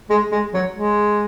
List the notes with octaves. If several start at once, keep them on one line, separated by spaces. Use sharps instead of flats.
G#3
G#3
F#3
G#3